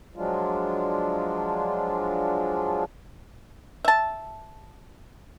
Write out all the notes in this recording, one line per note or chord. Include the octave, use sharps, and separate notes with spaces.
F3 F#3 G#3 D4 F4
E5 A5